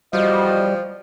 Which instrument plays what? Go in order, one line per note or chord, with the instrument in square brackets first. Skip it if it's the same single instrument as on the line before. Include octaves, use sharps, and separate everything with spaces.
[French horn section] E2 F#4 D#5 [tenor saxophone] F3 [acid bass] G3